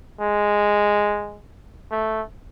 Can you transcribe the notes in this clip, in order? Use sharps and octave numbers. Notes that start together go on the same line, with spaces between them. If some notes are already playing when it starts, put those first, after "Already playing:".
G#3
A3